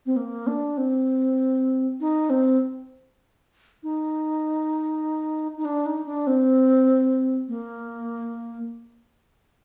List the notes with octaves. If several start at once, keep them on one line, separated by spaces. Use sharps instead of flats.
C4
A#3
D4
C4
D#4
C4
D#4
D#4
D4
D#4
D4
C4
A#3